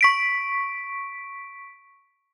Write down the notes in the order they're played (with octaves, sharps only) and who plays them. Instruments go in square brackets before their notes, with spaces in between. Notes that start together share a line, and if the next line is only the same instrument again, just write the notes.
[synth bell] C#6 B6 D7